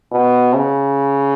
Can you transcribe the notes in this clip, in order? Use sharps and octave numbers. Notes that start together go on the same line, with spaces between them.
B2
C#3